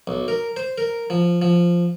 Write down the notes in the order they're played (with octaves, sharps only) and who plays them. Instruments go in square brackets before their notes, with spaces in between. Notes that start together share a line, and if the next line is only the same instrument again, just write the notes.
[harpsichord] B1
A#4
C5
A#4
F3
F3